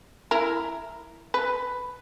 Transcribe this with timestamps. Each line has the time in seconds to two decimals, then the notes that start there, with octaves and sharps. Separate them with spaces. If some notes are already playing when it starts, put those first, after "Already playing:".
0.31 E4 A#4
1.34 B4